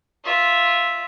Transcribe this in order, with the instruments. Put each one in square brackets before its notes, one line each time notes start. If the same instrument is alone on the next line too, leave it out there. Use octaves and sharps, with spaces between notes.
[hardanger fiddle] F4 E5